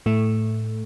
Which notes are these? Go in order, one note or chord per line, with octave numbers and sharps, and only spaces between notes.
A2 A3